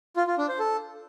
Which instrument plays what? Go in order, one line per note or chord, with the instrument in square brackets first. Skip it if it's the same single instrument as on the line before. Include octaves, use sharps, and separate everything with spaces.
[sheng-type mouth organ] F4
F4
D4
C5
A4